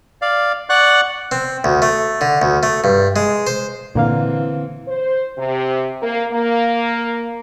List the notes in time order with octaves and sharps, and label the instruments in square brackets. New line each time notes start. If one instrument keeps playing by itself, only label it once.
[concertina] D5 F5
D5 F#5 C#6 F#6
[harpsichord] C4
D2
A3
D3
D2
A3
G2
G#3
C5
[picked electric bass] A#2 [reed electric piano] D3 A#3 F5 [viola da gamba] E3 C4
[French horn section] C5
C3
A#3
A#3